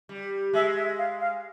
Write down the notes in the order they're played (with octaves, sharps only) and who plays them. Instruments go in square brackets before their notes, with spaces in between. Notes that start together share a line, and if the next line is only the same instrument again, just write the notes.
[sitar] G3
[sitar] G#3 [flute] E5
[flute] E5
F5
F5